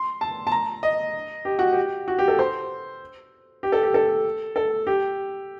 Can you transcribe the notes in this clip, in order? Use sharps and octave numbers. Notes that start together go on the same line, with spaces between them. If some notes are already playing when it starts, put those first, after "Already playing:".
Already playing: C6
A5
A5
A#5
D#5
G4
F#4
G4
F#4
G4
A4
C5
G4
A4
G4
A4
A4
G4